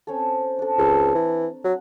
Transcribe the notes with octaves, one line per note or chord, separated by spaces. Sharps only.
C4 C#4 A4
D4 A4
C#2 A#5
E3
F#3 F#5